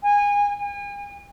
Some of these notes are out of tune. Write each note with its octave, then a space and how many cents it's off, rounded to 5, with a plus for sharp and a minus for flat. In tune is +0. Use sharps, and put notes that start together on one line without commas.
G#5 -25
G#5 -40